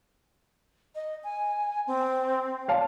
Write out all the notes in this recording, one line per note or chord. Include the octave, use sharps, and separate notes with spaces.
D#5
G#5
C4
C#5 F5 A5